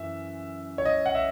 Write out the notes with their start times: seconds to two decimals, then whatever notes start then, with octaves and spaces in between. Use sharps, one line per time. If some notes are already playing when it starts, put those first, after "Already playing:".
Already playing: F#2 E3 E5
0.78 C#5
0.85 D#5
1.06 F#5
1.15 E5